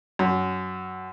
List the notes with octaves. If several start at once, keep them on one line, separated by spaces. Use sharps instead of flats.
F#2